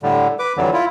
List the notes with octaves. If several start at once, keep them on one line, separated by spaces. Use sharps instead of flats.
A2 D3 G3
B4 D6
F2 D3 E3 F#3 G3
E4 F4